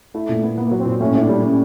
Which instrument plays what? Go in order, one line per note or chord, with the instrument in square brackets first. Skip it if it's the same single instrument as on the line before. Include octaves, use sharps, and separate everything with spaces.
[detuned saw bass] A3 [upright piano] E4
[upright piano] A#2
B3
[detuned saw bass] A#3 [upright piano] B3
[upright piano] F#3
[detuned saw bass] C4
[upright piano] A#2
[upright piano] A2 [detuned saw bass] C#4
[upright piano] A2
[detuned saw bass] D4
[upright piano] G3
[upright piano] G3 [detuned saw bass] C#4